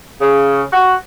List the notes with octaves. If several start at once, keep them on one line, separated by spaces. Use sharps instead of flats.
C#3
F#4